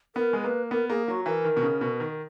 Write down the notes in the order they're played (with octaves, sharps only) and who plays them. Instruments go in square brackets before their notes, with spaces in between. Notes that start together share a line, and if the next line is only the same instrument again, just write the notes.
[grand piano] B3 [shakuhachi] A#4
[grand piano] G#3
[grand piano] A#3 [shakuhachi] B4
[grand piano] B3 [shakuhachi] A#4
[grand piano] A#3 [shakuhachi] G#4
[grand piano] F#3 [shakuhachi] F#4
[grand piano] E3 [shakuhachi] A#4
[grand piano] D#3
B2
C#3
B2
D#3